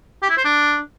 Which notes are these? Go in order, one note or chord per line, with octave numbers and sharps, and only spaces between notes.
G4
E4
C5
D4